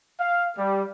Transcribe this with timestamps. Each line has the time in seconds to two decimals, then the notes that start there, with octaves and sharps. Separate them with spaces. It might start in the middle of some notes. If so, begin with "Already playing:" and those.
0.20 F5
0.58 G3